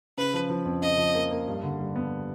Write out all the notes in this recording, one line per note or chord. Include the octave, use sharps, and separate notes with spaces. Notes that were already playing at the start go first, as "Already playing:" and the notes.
C#3 B4
F3
F3
F2
C#3 D#5
F3
A#3
A#3
G2
D3
G3
B3